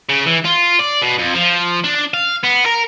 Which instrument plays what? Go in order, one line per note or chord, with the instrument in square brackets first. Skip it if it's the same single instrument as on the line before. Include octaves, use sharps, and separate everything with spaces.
[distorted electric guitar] C#3
E3
F4
D5
B2
F2
F3
D4
F5
B3
A#4